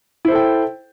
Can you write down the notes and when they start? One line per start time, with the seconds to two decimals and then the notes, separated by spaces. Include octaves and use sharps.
0.25 E4
0.28 C5
0.32 A4
0.35 G5